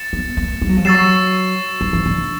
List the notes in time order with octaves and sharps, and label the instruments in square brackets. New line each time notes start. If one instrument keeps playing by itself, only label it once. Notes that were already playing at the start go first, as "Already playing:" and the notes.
Already playing: [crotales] A6 C#7 E7
[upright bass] B3
A#3
G3
F#3
F3
[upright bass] F#3 [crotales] C#6 E6 A6 C7 E7
[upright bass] F3
E3
D3